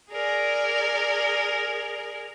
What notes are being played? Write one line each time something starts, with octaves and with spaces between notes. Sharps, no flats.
G#4 A#4 D5